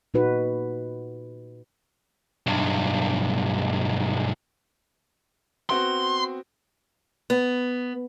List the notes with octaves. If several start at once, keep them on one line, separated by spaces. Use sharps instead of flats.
A#2 D#4 F#4 B4
B1 G2
B3 C4 F#4 C6
B3